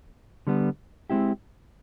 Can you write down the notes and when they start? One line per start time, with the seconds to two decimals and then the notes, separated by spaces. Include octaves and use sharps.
0.47 D3 G3 B3
1.10 G#3 C4 E4 G4